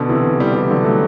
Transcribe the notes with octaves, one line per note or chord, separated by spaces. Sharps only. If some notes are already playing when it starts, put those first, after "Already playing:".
Already playing: B2 D3
C3 E3
E3 G3
E3 G3
D3 F#3
F#3 A3